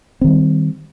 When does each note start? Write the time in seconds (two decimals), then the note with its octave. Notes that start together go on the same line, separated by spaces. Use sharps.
0.21 C4
0.24 D#3
0.27 G3